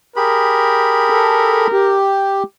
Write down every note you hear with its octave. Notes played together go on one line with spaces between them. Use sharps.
G4 G#4 A#4 B5
A4
G4